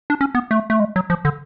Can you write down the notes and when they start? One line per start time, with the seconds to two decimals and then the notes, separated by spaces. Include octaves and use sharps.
0.10 D4
0.21 C#4
0.35 B3
0.51 A3
0.70 A3
0.80 G#3
0.96 F#3
1.10 F3
1.25 D3